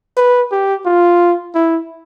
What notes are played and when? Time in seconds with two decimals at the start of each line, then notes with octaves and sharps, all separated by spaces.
0.17 B4
0.52 G4
0.86 F4
1.55 E4